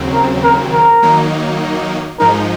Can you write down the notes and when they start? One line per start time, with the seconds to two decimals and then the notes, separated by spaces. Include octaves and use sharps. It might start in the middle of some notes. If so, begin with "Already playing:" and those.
Already playing: D#2 C#3 F#3 C4
0.14 A#4
0.44 A#4
0.73 A#4
1.02 D#3 F#3 A#3 D#4
2.20 G#2 F3 G#3 D#4 A#4